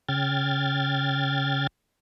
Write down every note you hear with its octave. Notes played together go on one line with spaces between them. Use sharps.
C#3 G5 F6 G#6 A6